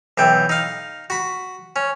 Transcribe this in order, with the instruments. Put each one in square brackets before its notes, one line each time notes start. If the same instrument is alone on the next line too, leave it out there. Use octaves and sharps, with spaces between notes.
[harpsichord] B1 E3 G5
D#4 F5
F#4 B5
C#4